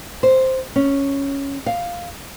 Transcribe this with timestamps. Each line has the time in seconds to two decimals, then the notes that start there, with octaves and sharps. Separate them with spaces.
0.23 C5
0.76 C#4
1.66 F5